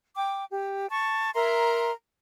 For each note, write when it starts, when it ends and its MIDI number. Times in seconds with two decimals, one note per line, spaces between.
0.16 0.44 79
0.16 0.44 86
0.51 0.87 67
0.90 1.30 81
0.90 1.30 85
1.34 1.91 70
1.34 1.91 76
1.34 1.91 82
1.34 1.91 84